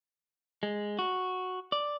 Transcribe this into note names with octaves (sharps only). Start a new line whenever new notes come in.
G#3
F#4
D5